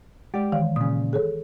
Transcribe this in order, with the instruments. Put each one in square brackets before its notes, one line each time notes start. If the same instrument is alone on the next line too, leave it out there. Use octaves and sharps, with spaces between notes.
[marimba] G#3 [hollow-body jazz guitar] G4 D5
[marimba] D#3 E3 F5
[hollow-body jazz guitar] A#2 C#3 [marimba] D#6
[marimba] G#4 A4 C#5